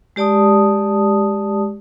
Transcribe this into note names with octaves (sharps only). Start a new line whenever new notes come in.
G#3 G4 D5 A5 D#6